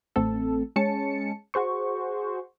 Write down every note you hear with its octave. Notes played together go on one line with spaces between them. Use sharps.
A1 A3 C4 A4
G#3 C#4 A5 C#7
F#4 G#4 C5 C#6